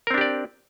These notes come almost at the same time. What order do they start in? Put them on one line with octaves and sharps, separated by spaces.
A#4 C4 D4 G4 D5